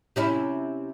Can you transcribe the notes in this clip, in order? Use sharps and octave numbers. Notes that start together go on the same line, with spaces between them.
C3 C#4 E4